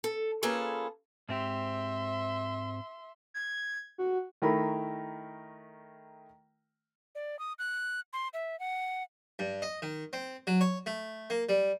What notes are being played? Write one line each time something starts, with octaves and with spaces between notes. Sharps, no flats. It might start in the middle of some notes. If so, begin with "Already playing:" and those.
A4
A#3 C#4 F4 G#4 A4 B4
G#2 C4 G4 E5 C6
G#6
F#4
D#3 A3 E4 A#4 B5
D5
D#6
F#6
C6
E5
F#5
G2
D#5
D#3
C4
F#3
C#5
A3
A#3
G3